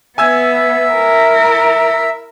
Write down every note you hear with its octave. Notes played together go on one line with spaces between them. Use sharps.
B3 E5 G#5 E6 G#6
E4 A#4